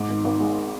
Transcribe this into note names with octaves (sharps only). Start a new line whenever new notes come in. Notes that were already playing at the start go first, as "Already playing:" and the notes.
Already playing: G#2 D6
G#1
G#1
G#3